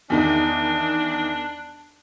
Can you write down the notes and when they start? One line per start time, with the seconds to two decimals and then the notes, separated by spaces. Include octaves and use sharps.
0.10 E2 D#3 D4 D#4